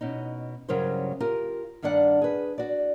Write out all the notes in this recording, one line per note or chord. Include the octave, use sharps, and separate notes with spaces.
B2 C#4 D#4
G2 C#3 F#3 C#4 A#4 C5
F4 G4 A#4
G2 D#3 D4 D5 F#5
G#4 B4
F#4 D5